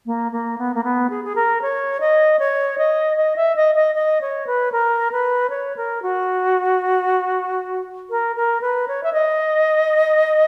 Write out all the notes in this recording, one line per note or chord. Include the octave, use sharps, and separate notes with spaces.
A#3
A#3
B3
A#3
B3
G#4
G#4
A#4
C#5
D#5
C#5
D#5
D#5
E5
D#5
D#5
D#5
C#5
B4
A#4
B4
C#5
A#4
F#4
A#4
A#4
B4
C#5
E5
D#5